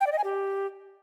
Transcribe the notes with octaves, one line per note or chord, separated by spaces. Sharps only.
G5
D5
D#5
G#5
G4